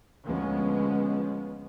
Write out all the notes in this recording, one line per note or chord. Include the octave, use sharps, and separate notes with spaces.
D2 F3 G#3 B3 C#4